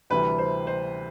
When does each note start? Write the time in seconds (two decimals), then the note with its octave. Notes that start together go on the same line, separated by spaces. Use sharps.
0.10 D2 C3 E3 G3 B4
0.38 C5
0.67 C5